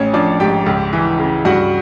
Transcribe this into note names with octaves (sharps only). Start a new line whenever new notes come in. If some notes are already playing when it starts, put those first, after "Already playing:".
Already playing: A1 C#4 C#5
F3 D4 D5
G#2 G4 G5
C#2
E3
C#3
G2 F#4 F#5